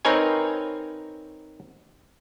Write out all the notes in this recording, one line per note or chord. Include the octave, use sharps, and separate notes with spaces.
C4 D#4 A#4 B4 C#5 G#5